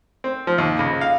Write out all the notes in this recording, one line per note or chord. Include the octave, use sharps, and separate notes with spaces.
C4
F3
D#2
C#2
F5